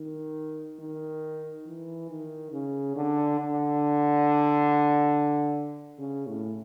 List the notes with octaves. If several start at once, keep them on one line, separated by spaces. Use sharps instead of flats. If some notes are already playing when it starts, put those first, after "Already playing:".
Already playing: D#3
D#3
E3
D#3
C#3
D3
D3
C#3
A2